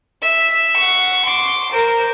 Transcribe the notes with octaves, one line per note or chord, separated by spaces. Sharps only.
E5
F#5 C#6
C6 D6
A#4 C5